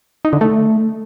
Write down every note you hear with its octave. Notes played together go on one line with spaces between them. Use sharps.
D#4
D3
A3